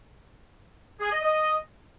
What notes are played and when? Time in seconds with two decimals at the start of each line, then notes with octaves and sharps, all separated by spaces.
1.00 G#4
1.11 D#5
1.23 D#5